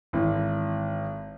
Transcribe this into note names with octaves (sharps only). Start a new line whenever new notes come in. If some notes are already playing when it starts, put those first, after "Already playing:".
G#1 E3